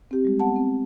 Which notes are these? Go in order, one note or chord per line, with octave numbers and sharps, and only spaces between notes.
C4 G4
G3 G#3
B3 F#5 A5
C4